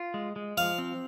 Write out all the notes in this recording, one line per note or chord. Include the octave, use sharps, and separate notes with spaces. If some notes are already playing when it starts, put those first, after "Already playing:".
Already playing: F4
G#3
G#3
F3 F5
C4